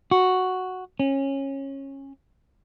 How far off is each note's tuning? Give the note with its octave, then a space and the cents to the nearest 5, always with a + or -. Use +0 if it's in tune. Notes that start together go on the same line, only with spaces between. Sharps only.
F#4 +0
C#4 -20